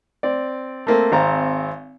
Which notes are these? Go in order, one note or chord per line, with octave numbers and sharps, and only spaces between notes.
C4 D5
A3 A#3 C4
G#1 C4 F5 A#5